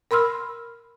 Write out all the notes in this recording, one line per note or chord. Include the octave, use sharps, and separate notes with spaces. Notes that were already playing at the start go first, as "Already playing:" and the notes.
A#4 B5 C6 E6 F6